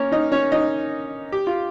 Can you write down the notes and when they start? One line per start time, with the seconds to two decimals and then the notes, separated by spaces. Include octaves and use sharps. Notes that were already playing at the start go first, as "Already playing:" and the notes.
Already playing: A#3 C#4 A#4 C#5
0.12 D#4 D#5
0.32 C#4 C#5
0.52 D#4 D#5
1.32 G4
1.47 F4